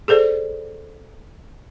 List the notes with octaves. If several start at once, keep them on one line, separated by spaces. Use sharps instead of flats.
G#4 A4 C5 D5